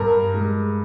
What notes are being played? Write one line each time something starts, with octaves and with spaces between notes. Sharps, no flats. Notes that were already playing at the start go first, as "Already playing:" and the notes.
Already playing: G2 A#4
G#3